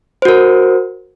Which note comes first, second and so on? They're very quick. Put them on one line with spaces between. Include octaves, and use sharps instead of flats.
C5 F#4 A#4